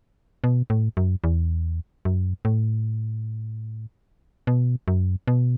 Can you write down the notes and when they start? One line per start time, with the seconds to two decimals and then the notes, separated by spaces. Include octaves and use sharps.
0.44 B2
0.70 A2
0.97 F#2
1.24 E2
2.05 F#2
2.45 A2
4.47 B2
4.88 F#2
5.27 B2